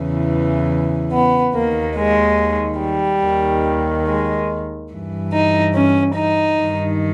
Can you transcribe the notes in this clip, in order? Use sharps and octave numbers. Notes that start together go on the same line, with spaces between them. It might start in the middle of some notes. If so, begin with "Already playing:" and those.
Already playing: E2 C#3 E3
B3
D#2 D#3 A#3
G#3
G3
D#2 D#3
G#3
G2 E3
D#4
C#4
D#4
G2 D#3